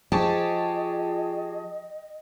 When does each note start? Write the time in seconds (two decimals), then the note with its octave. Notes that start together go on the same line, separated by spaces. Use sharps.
0.12 F3 G4 G#4 D#5 A5 C#6